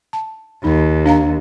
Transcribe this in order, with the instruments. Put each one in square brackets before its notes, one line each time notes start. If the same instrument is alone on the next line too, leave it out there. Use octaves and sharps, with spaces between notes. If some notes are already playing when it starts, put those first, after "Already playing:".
[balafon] A5
[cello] D#2 [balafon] D#4
[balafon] D4 F5 A#5